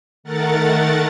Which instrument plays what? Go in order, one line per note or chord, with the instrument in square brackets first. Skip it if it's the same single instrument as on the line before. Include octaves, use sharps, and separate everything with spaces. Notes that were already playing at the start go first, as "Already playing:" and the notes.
[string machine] D#3 A3 A#4 F#5 A6